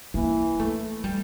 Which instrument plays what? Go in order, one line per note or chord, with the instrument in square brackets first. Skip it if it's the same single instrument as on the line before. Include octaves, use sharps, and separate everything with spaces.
[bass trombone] E3 [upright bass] A#3
[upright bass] A3
G3